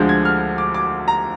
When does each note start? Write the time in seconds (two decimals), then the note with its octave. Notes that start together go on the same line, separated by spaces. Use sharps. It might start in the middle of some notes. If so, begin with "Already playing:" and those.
Already playing: D2 D3 F3 G#3 G6
0.09 G#6
0.25 F6
0.58 D6
0.74 D6
1.08 A#5